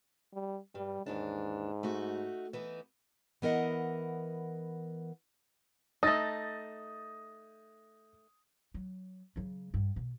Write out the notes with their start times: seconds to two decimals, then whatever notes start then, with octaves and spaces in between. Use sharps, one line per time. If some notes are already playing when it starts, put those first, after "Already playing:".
0.33 G3
0.75 G2 G3
1.06 D#2 G#2 E3 D4
1.83 A3 D#4 F#4
2.53 E3 B3 D#4
3.42 E3 B3 A#4 D#5 F#5
6.03 A3 D#4 D#6 A6 A#6
8.74 F#3
9.36 C#3 F#3
9.74 G2
9.96 B2